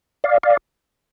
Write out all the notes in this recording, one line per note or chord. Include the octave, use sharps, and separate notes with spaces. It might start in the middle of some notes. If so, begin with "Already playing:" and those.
D5 F5
D5 F5